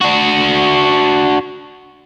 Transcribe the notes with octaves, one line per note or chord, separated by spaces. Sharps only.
D4 F#4